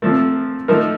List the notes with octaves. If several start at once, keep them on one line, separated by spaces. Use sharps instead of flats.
C3 F3 A3
F3 A3 D#4 A#4